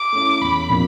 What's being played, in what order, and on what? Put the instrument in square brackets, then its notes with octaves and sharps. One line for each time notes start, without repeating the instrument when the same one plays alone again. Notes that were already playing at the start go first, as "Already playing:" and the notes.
Already playing: [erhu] D6
[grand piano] A3 C#4 E4
[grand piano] E2 [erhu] B5
[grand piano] C3 F3 A#3 D4